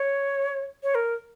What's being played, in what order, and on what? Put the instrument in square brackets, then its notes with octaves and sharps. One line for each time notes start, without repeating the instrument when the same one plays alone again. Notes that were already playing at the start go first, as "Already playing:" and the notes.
Already playing: [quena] C#5
C#5
A#4